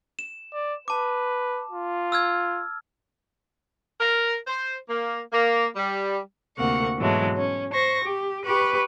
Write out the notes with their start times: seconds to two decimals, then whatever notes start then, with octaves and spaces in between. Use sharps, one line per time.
0.19 E7
0.53 D5
0.88 B4 A5 D6
1.70 F4
2.12 E6 F6 G#6
4.00 A#4
4.47 C5
4.89 A#3
5.33 A#3
5.76 G3
6.57 D2 C3 A#3 F#5 C#6
6.98 G#2 B2 E3 F#3 G#3 A3
7.38 C#4
7.73 C5 C#6 A#6
8.05 G4
8.46 G4 B4 B5 C#6